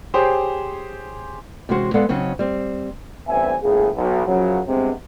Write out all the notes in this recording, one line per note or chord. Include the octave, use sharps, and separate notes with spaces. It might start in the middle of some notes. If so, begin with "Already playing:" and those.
G4 G#4 C5 C#5 C6
C3 E3 G#3 C#4 F#4 C5
G#3 B3 A4 D5 F5 F#5
C#3 F#3 C4 C#4 D#4
G3 C4
A1 G2 B3 C4 E5 G#5
G1 A2 A#3 G#4
B1
F#2 C#3 F3 F#3
G2 C3 G#3 B3 C4